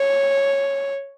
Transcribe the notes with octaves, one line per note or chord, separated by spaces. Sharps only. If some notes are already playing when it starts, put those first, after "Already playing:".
Already playing: C#5